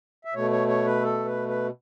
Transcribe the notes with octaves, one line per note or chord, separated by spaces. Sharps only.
E5
B2 A3 C#5
C#5
C#5
B4
A4
B4
B4